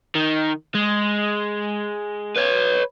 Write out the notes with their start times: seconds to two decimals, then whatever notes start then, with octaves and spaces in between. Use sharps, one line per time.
0.15 D#3
0.75 G#3
2.36 B4 C#5